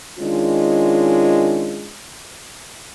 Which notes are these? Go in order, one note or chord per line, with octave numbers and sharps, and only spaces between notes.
D#3 G#3 C#4 D4 F4